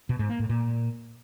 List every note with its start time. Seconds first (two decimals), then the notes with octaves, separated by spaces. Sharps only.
0.09 B2
0.19 G#2
0.29 A#3
0.39 A2
0.49 A#2